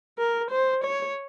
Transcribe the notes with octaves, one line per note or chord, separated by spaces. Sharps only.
A#4
C5
C#5